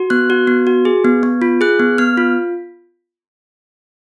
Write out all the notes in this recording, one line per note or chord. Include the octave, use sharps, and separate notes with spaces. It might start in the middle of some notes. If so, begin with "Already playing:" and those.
Already playing: F#4
B3 F#6
F#4
B3
F#4
G#4
B3
B3
F4
G#4 F#6
B3
B3 F6
F4